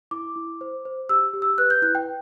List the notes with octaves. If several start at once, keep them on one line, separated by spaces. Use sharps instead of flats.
E4 D6
E4
C5
C5
G4 E6
G4
E6
B4 F#6
G6
E4 F#6
G5